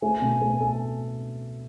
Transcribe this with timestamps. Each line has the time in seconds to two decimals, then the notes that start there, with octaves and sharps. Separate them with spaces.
0.02 A3 G#5
0.22 B2
0.42 A3
0.61 A4